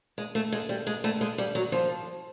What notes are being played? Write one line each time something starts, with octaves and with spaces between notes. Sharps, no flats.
G#3
A3
G#3
G3
G#3
A3
G#3
G3
F#3
F3